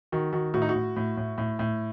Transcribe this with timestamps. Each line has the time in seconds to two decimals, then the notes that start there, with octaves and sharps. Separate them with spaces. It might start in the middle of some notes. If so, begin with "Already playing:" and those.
0.12 D#3 F#4
0.33 D#3 F#4
0.54 A2 F#4
0.62 D#4
0.69 F#4
0.75 A2
0.96 A2
1.17 A2
1.38 A2
1.59 A2